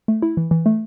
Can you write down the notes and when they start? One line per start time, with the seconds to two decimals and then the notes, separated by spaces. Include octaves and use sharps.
0.08 A3
0.22 E4
0.37 E3
0.51 E3
0.66 A3